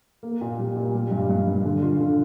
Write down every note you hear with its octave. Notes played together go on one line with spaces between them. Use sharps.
A#3
A#2
G3
A#2
G3
G2
G2
G2
D3
F4
D3